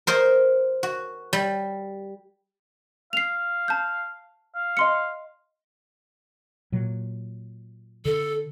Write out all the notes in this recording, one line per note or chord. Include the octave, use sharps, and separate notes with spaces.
A#4 C5 D#5
F#4
G3
F5 C7 F7
A5 G6
F5
D#5 C6 C#7
A#2 F#3
D3 A4